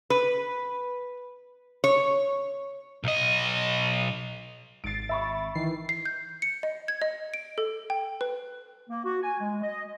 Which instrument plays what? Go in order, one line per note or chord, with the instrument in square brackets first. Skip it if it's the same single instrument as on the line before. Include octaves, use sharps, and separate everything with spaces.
[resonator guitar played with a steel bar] B4
C#5
[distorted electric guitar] B1 D#5
[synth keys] G#1 A6 [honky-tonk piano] C7 D7
[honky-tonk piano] E5 B5 C#6
[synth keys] D#3 E3 C7
[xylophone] C7
G6
C#7
D#5
G#6
D#5
D7
A4
G5
B4
[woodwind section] A#3
F#4
G#5
G#3
D#5